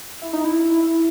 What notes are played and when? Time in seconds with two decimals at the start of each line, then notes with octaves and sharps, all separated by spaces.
0.22 E4
0.33 D#4
0.44 E4